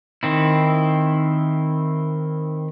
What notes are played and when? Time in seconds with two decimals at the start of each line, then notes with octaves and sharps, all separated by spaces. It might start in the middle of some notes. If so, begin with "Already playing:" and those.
0.23 D#3 C4 E4